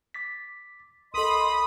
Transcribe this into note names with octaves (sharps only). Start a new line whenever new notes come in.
D6 A6 B6
C2 A4 D#5 B5 C6 D#6